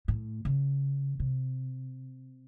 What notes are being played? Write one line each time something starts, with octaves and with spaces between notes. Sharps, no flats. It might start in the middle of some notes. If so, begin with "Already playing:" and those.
A2
C#3
C3